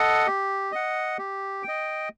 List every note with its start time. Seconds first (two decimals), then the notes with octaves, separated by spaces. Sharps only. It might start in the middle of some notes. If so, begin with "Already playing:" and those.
Already playing: A4 D#5 F#5
0.27 G4
0.72 D#5 F#5
1.18 G4
1.63 G5
1.68 D#5